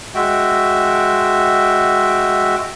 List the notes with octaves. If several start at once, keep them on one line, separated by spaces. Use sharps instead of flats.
G#3 F#4 E5 G5